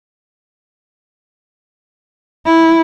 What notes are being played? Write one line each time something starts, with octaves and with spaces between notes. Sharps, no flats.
E4